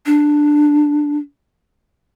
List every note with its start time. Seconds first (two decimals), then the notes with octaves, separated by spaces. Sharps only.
0.06 D4